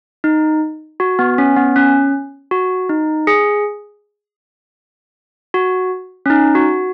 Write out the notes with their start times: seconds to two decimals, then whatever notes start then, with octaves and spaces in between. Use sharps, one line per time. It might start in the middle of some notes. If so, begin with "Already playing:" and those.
0.24 D#4
1.00 F#4
1.19 B3
1.38 C#4
1.56 B3
1.76 C#4
2.51 F#4
2.89 D#4
3.27 G#4
5.54 F#4
6.26 C#4
6.30 D#4
6.55 F#4